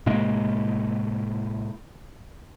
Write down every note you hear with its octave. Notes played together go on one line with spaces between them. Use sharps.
A2 C3 G#3 A#3